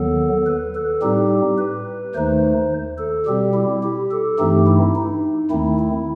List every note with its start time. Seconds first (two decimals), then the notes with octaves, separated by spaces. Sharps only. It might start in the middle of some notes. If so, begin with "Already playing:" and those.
Already playing: D#2 D#3 F#3 B3 A4
0.47 B4
0.75 A4
1.02 A2 G3 C4 D#4 G4
1.58 B4
2.15 D#2 D#3 A3 D#4 C5
2.98 A4
3.26 B2 G3 C4 G4
3.54 E4
3.83 G4
4.11 A4
4.39 G2 E3 A3 C4 D#4 G4
4.67 E4
4.95 D#4
5.51 D#2 D#3 A3 C4 E4
5.79 E4